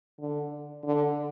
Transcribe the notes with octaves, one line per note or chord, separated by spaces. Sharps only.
D3
D3